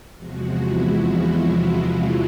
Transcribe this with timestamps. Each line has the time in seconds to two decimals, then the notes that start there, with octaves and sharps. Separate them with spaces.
0.16 E2 C3 F3 G#3 F#4
0.51 E4
0.86 F4
1.20 E4
1.55 F4